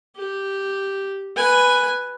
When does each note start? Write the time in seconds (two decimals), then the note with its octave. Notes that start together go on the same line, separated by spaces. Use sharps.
0.16 G4
1.37 B4 G#5